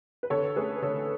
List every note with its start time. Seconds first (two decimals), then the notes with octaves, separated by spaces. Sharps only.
0.23 B4
0.30 D3 A4 C#5
0.56 A3 C#4 G#4 B4
0.82 D3 A4 C#5